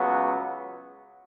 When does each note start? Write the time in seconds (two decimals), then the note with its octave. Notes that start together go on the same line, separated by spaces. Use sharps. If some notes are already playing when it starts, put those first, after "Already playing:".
Already playing: C#2 C#3 F#3 B3 F#4